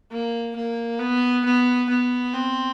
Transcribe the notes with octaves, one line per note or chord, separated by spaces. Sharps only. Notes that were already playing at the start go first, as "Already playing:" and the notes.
A#3
A#3
B3
B3
B3
C4